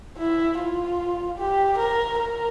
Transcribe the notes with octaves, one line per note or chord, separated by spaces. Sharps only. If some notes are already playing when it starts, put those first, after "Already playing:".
E4
F4
G4
A#4
A#4